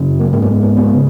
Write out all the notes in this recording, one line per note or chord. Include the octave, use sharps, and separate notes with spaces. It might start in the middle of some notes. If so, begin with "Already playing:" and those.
Already playing: F#2 C#3
A#3
G#2 A#3
B3
B3
B3
C#3